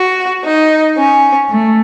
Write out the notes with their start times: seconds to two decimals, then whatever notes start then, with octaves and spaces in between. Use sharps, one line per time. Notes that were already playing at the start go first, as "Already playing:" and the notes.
Already playing: F#4
0.44 D#4
0.97 C#4
1.49 A3